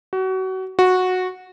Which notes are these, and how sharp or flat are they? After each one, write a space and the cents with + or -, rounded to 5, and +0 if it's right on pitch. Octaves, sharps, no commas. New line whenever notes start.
F#4 +30
F#4 -10